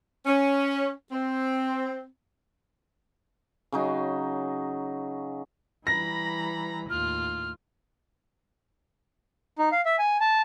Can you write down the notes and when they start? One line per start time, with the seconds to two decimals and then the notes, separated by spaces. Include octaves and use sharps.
0.26 C#4
1.12 C4
3.72 C#3 F#3 D#4
5.87 E3 G3 A#5 B5 A#6
6.90 D#2 A2 F4 F6
9.59 D#4
9.72 F5
9.86 E5
9.99 G#5
10.20 A5